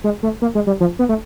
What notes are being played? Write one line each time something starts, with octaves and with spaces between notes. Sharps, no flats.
G#3
A3
A#3
G#3
G3
F3
B3
A3